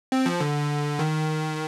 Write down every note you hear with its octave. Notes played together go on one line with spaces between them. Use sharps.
C4
F3
D3
D#3